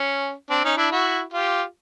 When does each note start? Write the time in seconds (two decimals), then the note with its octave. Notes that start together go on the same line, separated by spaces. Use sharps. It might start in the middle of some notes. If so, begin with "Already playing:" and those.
Already playing: C#4
0.50 C4 D4
0.64 C#4 D#4
0.77 D4 E4
0.92 E4 F#4
1.33 F4 G4